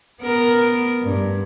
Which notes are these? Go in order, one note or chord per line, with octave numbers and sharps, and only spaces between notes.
B3 A#4
G2